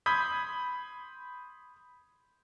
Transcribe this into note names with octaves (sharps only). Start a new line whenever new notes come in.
B5 C6 D#6 G6 G#6 B6